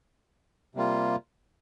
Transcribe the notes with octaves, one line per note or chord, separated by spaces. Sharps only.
C3 G3 A#3 F4